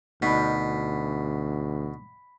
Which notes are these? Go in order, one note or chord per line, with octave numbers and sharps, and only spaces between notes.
D2 B2 D4 D#4 A#4 B5 B6